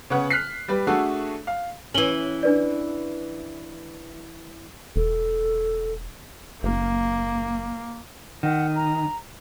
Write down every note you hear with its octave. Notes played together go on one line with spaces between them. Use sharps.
C#3 B3 C#5 F#5
F6 F#6 B6 C7
G3 G4 B4
A3 D4 F#4 G#4 A4
F5
E3 C#4 F#7 G7
D4 B4 D5
E1 A4
F#1 A#3
D#3 F#5
A#5